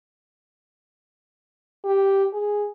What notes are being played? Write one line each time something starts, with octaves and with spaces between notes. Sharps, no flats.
G4
G#4